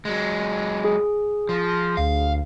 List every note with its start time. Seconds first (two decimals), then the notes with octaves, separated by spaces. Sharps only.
0.05 F#3 G#3
0.85 G#4
1.49 F3 C6 A#6
1.97 D2 F5